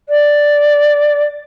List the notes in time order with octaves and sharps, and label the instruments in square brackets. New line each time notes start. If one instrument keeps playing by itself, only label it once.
[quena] D5